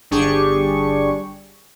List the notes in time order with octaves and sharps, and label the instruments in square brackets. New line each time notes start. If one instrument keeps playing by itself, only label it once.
[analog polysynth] G1 D4 G4 G#4 C#6